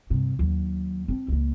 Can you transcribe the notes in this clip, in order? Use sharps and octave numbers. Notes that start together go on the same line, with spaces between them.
G2 C3
D#2 F#3
C4 D4
C#2 A#3